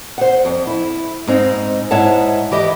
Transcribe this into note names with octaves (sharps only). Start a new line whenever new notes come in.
C5 F#5
F2
E4
G#2 C4 D#4
G#2 E4 C#5 E5 F#5 A5
E3 G4 D#5